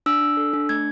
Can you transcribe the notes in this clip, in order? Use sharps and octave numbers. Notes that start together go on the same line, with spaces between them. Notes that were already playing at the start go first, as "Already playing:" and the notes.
D4 E6
D4
A4
D4
A3 G#6